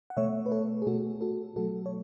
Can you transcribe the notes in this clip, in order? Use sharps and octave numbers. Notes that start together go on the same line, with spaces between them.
F#5
B2 A3 C#5 E5
B4
A4 C#5
G#4
B2 A3 F#4 A4
F#4 A4
B2 F#3 A3 F#4 A4
C#5